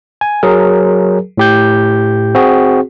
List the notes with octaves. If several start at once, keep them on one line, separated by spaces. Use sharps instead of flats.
G#5
F#3 G#4 A#4
A2 G4 G6
C4 F#4 G#4